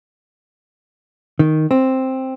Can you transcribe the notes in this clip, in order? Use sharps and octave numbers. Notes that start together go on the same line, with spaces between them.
D#3
C4